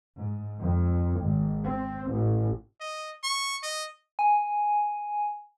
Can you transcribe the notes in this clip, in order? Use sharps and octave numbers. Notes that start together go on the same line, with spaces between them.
G#2
F2
G#1
C4
A1
D#5
C#6
D#5
G#5